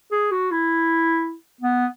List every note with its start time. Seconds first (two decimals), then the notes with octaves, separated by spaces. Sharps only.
0.12 G#4
0.32 F#4
0.52 E4
1.61 B3